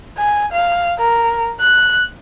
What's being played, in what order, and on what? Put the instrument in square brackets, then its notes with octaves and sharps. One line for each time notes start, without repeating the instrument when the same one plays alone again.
[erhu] G#5
F5
A#4
F#6